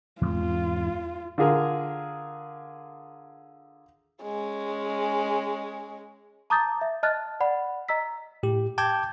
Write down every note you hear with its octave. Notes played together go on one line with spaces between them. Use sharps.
E2 G#2 C4 F4
D3 F4 G#4 A#4
G#3 C#4
A5 A#5 D6 D#6 G6 A6
E5
D#5 A5 F6 F#6 A6
D5 F#5 B5
D#5 A#5 E6 B6
A2 G4
G5 A5 D6 G6 G#6